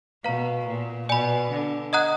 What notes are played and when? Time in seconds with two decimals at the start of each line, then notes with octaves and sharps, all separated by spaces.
0.24 B2 B4 F5 A#5
0.66 A#2
1.08 B2 D5 G#5 B5
1.50 D3
1.93 D#5 F#5 A#5 D#6 F#6